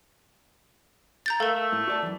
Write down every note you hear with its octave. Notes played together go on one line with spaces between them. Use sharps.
A#5 G6 A6
A3 A4 A#4 F5
A3
A2
F#4 D5 A5
F#2 E3